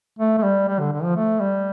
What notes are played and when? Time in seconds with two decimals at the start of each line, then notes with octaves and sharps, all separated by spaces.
0.19 A3
0.38 A3
0.43 G3
0.68 G3
0.80 D3
0.92 D3
1.04 F3
1.16 A3
1.40 G3